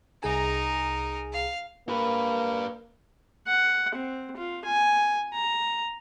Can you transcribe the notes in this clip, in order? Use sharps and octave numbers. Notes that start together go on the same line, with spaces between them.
C2 D#4 G#4 A#4 G#5
F5
A#3 G4 B4
F#5
C4
F4
G#5
A#5